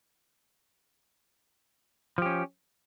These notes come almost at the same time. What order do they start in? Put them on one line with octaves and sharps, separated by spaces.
F3 G4 C#4